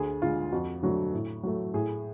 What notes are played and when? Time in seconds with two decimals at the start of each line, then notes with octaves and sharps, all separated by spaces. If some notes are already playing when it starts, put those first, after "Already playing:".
Already playing: D2 G#4
0.22 D3 G#3 F4
0.52 F2 F#4
0.83 D3 F#3 A3
1.14 A2
1.43 F#3 A3
1.74 A2 G#4